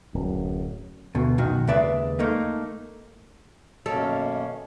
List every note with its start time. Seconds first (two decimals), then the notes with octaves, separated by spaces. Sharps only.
0.14 D1 F#2
1.15 D2 B2
1.38 B1 F#2 D#3 F#4
1.67 D#2 C#3 G#3 B4 D5 E5
2.19 A3 A#3 D#4
3.86 F#2 B2 D#3 A#3 C#4 A4